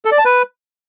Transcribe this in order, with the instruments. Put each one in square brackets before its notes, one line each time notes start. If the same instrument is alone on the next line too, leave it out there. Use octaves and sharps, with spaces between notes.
[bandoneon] A4
D5
A5
B4